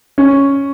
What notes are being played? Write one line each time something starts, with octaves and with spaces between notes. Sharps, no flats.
C#4